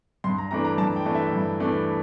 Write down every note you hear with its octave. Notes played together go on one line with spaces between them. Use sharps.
G2 C6
A#5
E3 A3 D4 A#5
A#5
G2 A5
G5
E3 A3 D4
E5
G2
E3 A3 D4